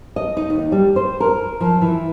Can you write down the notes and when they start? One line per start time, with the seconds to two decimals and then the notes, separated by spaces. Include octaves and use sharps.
0.16 D#5
0.37 D#4
0.50 D#2
0.72 G3
0.96 C5
1.20 A#4
1.60 F3
1.81 E3